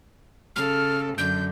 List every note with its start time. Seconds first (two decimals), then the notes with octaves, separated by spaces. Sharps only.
0.56 C#3 A4 F6
1.18 F#2 D3 G6